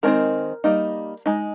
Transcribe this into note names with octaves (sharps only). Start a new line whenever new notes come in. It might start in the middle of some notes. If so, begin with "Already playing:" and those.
D#3 G#3 C4 D#4 A#4
G3 A#3 D#4
G#3 D#4